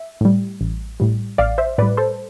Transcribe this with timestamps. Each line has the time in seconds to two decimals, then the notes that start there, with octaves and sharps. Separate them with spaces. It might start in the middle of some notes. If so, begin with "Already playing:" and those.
Already playing: E5
0.21 A2 G3
0.61 A1
1.00 A2 G3
1.38 A1 D5 F5
1.58 C5 E5
1.78 A2 B4 D5
1.82 G3
1.97 A4 C5